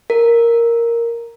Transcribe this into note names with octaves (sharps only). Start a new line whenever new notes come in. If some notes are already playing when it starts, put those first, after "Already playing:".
A#4